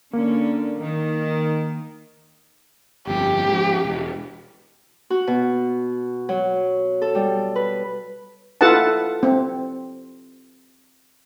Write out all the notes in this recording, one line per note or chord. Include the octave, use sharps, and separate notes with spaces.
D3 A#3 C#4
D#3
G1 F2 G4
G#2 F3
E1
F#4
B2
F#3
A4
G3
B4
E4 F4 A4 B4 F#5 A5
C4